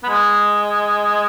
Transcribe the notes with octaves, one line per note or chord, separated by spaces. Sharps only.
B3
G#3